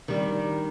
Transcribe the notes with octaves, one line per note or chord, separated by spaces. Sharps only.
D#3 G3 D4